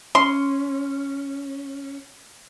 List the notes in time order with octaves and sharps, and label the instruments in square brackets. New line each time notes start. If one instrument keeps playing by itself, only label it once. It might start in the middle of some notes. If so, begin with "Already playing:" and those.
[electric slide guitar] C#4 [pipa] C6